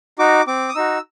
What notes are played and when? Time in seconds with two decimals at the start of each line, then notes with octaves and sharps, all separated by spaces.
0.19 D#4 F#4 D6
0.47 C4 D6
0.69 D#6
0.75 D#4 F#4 E6